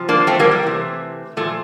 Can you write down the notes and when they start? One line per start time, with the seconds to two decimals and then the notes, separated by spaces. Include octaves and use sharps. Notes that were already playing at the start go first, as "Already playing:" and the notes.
Already playing: C3 F3
0.09 A#3 D4
0.27 A3 C4
0.39 G3 A#3
0.51 A3
0.63 C3 E3
1.37 A#2 F3 A3